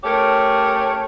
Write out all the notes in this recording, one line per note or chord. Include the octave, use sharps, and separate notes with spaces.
A3 C#4 G4 A#4 C#5